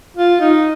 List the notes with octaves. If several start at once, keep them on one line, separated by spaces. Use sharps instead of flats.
F4
D#4